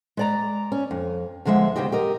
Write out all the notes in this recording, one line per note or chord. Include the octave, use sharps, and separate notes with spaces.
G#3 D5 A#5
C#4
F2
E2 D3 F3 G#3 E5 F#5
D2 A#2 C#3 C4 G4 D#5
G4 A#4 D#5